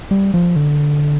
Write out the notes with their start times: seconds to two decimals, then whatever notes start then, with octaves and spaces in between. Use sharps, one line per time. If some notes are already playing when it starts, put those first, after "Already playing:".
0.11 G3
0.34 F3
0.56 D3